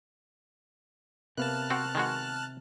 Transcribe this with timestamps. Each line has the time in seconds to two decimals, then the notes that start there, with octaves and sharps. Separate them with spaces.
1.37 C3 A#3 B3 A5 F6 F#6
1.70 C4 F#4
1.95 D#3 G#3 F#4